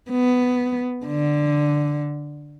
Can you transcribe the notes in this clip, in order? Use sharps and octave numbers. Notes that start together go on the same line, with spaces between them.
B3
D3